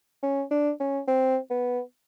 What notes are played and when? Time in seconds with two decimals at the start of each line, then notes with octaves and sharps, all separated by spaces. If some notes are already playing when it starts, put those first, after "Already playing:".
0.23 C#4
0.51 D4
0.80 C#4
1.08 C4
1.50 B3